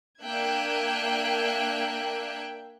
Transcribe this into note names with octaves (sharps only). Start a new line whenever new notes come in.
A#3 D4 E5 G5 F#6 G#6